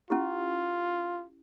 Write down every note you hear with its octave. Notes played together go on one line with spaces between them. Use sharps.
C#4 E4 F4 G4